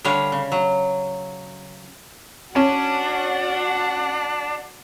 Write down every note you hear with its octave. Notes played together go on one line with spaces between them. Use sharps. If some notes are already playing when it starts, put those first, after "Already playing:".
D3 G3 C#5 F5 F#5
C#3
F#3
C#4 D4 F#4 F#5